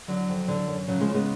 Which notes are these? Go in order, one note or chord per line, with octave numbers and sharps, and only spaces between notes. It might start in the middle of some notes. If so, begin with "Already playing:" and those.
D3 F#3
F2
D3
F#2
C#3 F#3
F3 G#3
C#3
G#3 B3